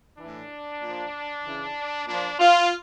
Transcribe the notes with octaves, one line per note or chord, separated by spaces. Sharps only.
A2 E3 D4
A#2 F3
C#3 E3
A#2 F3 D4
F4